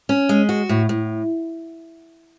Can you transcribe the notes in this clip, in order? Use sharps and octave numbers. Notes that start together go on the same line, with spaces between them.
C#4
G#3
F#4
A2
A2